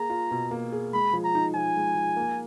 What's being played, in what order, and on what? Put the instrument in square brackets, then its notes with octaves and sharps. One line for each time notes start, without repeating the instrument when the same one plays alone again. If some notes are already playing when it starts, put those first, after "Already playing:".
Already playing: [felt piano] A#3 G#4 [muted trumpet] A#5
[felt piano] F4
B2
A#3
G#4
[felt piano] G#3 [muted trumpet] B5
[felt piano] F3
[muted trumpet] A#5
[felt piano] D#4
[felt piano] F3 [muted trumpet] G#5
[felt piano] G#3
F3
A#3